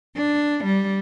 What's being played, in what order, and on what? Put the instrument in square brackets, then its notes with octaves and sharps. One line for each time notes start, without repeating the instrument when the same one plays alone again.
[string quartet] D4
G3